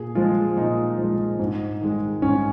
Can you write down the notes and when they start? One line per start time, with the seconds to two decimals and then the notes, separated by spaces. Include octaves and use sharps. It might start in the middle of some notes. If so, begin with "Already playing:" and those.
Already playing: A#2 G#4
0.15 F3 G#3 F4
0.57 A#2 D#4
0.98 F3 G#3
1.39 G#2
1.81 D#3 G#3
2.22 G#2 C#4